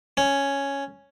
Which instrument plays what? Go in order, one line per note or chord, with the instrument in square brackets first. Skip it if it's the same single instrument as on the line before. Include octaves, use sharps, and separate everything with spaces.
[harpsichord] C#4